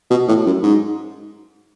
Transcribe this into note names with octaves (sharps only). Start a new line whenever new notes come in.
B2
A2
F#2
G#2